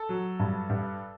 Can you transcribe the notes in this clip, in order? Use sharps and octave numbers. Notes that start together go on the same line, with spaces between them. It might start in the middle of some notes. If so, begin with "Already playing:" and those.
Already playing: A4
F#3
G2
G2